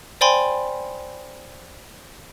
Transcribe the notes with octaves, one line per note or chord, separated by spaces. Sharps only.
C5 D5 G5 G#5 B5 C6